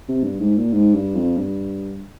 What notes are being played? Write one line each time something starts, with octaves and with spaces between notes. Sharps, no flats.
C3
G2
G#2
A#2
G#2
G2
F2
G2